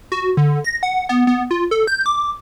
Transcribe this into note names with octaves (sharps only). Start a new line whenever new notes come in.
F#4
D3
A#6
F#5
B3
B3
F4
A4
G6
D6